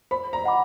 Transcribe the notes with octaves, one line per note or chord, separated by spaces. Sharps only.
C5 B5
A#5
D#5 F#5 B5 D6